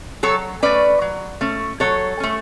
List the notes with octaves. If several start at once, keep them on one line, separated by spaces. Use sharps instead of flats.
F#3 A4 C#5
A3 C#4 B4 D5
F#3
A3 C#4
F#3 A4 C#5
A3 C#4